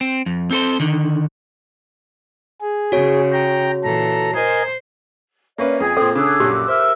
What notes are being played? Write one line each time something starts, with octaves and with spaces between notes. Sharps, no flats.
C4
F2
C4 A4 C5
D3 D#3
G#4
C#3 F#4 C#5
G5 A#5
A#2 E3 A4 A#5
A#4 C5 D#5 G#5
A#3 C#4 B4 C#5 D5 E5
F2 G#4 G5 G#5
A#2 C4 A4 C5 G5
C#3 D4 G#4 D6 E6 F#6
A#1 F#2 G4
A#4 C5 E5